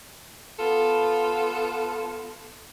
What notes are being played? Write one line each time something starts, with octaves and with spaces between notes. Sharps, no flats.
B3 F4 A4